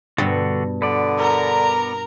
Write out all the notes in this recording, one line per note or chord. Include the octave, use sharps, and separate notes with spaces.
G2 B2 D3 G3 F#4 A4
D3 B3 D5
A#4 A#5